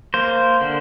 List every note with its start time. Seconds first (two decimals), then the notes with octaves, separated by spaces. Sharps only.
0.14 A#3 C5
0.61 D3